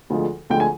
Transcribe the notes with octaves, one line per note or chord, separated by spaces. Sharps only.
D2 D3 F3 G#3
D2 D3 F3 G#3 G5
G#5